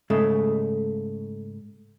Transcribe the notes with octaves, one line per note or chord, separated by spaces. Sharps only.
G#2 C#3 G#3 A3